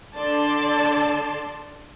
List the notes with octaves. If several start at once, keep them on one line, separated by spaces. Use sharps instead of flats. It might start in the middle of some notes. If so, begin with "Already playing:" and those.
D3 D5 A5 C6